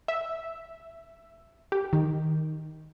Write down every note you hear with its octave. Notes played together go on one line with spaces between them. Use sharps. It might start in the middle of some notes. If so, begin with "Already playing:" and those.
E5
G4
D#3